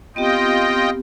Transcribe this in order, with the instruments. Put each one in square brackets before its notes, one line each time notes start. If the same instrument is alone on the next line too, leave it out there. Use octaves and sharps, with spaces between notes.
[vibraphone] B3 C4 G4 [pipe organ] F4 D#5 G5